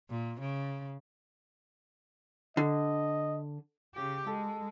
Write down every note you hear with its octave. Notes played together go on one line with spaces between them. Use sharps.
A#2
C#3
D3 D#5
C#3 G4
G#3 A4